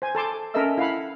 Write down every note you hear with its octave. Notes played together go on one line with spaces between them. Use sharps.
C5 G#5
A4 A5 C6 D6
C#4 A4 A#4 D#5 E5 E6
E4 F5 F#5 B5